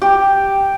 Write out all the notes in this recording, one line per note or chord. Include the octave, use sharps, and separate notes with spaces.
G4